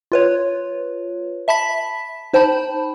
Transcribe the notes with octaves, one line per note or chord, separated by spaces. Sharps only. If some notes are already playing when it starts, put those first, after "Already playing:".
F4 B4 C#5
E5 A5 B5 B6
D#4 C5 G5 A5 B5